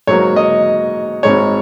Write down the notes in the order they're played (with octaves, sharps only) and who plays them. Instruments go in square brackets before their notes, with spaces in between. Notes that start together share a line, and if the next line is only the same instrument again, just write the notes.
[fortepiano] G#2 F#3 A#3 C#5
D#5
G#1 G#2 G#3 C#5